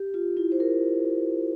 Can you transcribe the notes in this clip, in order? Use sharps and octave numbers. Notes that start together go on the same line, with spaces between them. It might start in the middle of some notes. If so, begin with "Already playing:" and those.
Already playing: G4
F4
E4
C5
A#4